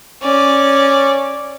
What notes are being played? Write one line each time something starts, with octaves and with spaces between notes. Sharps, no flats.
C#4 D5